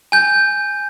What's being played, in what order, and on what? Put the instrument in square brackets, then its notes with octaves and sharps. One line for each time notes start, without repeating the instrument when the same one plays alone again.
[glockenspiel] G#5 G6